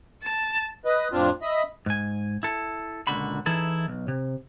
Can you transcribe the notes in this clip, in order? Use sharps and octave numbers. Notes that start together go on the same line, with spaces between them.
A5
B4 D#5
F2 A2 C4 D4 F4
D#5 E5 B5
G#2 G#5
E4 A4
C#2 A#2 D3 F#4 B5
E3 D#4 E4 G#4 A4
B1
C3